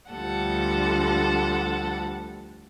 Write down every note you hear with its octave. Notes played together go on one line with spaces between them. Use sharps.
D2 F3 G3 A4 F#5